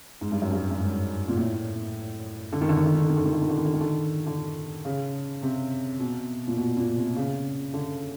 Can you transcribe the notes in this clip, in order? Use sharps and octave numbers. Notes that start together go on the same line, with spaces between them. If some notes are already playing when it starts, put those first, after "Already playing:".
G#2
G2
F#2
G2
G2
G#2
A#2
A2
D3
D#3
D3
D#3
D3
D#3
D3
D#3
D3
D#3
D3
D#3
D3
D#3
D3
D#3
D3
D3
C#3
C3
B2
A#2
B2
A#2
C3
C#3
D3